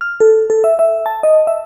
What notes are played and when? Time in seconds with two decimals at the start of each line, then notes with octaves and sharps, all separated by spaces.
0.01 F6
0.20 A4
0.50 A4
0.64 E5
0.79 E5
1.06 A5
1.23 D#5
1.47 E5